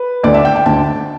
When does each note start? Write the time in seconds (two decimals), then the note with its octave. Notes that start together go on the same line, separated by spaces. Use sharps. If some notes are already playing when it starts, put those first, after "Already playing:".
Already playing: B4
0.23 D2 D3 D5
0.34 E5
0.45 G5
0.56 G5
0.65 D2 D3 A5